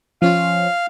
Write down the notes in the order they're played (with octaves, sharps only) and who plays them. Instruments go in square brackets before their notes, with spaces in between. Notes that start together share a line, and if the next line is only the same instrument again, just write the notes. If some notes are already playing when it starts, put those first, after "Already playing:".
[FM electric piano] F3 C#4 F4 [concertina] F5